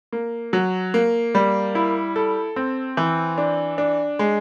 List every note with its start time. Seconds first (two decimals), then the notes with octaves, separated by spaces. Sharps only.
0.12 A#3
0.53 F#3
0.94 A#3
1.35 G3
1.75 E4
2.16 A4
2.56 C4
2.97 E3
3.38 D4
3.78 D4
4.19 G#3